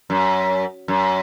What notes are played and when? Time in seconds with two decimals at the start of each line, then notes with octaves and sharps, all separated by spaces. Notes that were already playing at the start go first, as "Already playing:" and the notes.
0.10 F#2
0.88 F#2